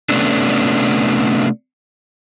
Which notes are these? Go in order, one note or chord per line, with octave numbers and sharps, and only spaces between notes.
C3 A3 B3 C#4 D4